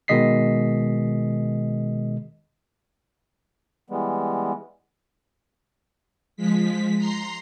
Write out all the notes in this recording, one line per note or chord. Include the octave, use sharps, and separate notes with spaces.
B2 D#3 G#3 D#5 B6 C7
E3 G3 G#3 B3
F3 G#3 B6
A#5 C6 C7